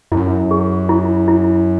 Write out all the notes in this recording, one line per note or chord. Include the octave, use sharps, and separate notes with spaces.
F#2 E4
G#4
E4
E4